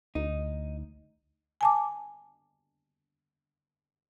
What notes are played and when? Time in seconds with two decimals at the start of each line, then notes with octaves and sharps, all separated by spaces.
0.15 D2 D#4
1.61 G#5 A5 D6